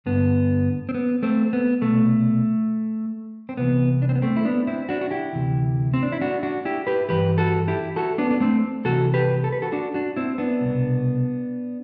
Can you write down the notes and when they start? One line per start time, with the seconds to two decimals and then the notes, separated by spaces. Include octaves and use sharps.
0.06 G2 D3 B3
0.89 C4
0.94 B3
1.23 A3 C4
1.53 B3
1.81 C2 B2 A3
3.49 C4
3.57 C2 C3 E3 B3
4.02 D4
4.09 C4
4.16 B3
4.22 A3 C4
4.36 E4
4.45 B3 D4
4.67 C4 E4
4.89 D4 F#4
5.01 F#4
5.11 E4 G4
5.33 D2 C3 E3
5.94 C4
6.03 D4
6.12 E4
6.21 D4 F#4
6.43 D4 F#4
6.65 E4 G4
6.87 G4 B4
7.09 G2 E3 G4 B4
7.38 F#4 A4
7.68 E4 G4
7.96 F#4 A4
8.18 B3 D4
8.31 D4
8.40 A3 C4
8.85 C2 C3 E3 F#4 A4
9.14 G4 B4
9.44 A4
9.52 B4
9.62 F#4 A4
9.72 D4 F#4
9.94 D4 F#4
10.16 C4 E4
10.38 B3 D4
10.61 C2 B2